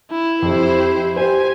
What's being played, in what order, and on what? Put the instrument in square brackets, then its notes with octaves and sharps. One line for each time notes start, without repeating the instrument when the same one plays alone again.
[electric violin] E4
[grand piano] F2 [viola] G4 C5
[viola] G4 [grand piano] C5 [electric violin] G#5